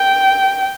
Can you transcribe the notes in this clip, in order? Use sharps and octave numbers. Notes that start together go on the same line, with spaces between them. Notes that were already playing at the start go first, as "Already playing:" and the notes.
Already playing: G5